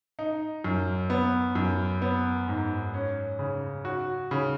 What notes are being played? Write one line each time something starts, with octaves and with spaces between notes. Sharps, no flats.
D#4
F#2
B3
F#2
B3
G#2
C#4
C#3
F#4
C#3